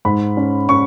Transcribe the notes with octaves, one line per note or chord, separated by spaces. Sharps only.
G#2 B5
C#4
C#4 C#6